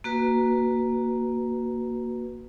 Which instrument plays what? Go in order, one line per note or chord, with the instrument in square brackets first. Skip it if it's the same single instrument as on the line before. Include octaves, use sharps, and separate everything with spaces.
[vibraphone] A#3 F#4 B4